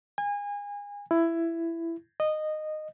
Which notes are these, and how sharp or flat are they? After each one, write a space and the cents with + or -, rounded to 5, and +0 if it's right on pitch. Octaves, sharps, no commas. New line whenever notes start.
G#5 -30
E4 +15
D#5 -15